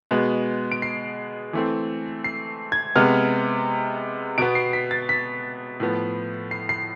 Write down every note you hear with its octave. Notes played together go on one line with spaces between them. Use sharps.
B2 G#3 B3
D7
C7
E3 A3 C4
C7
G#6
C3 G#3 B3 F6
B2 B3 D7
C7
B6
A6
B6
A2 F3 B3
C7
C7